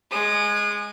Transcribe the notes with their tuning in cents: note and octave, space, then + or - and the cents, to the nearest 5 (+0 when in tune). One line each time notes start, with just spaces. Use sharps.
G#3 +0 D#6 -35